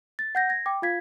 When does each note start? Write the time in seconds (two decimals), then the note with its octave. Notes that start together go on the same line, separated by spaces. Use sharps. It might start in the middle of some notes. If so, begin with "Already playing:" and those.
0.19 A6
0.35 F#5 G6 A#6
0.49 G#6 A#6
0.66 G5 D6
0.82 F4 F5 G#6 B6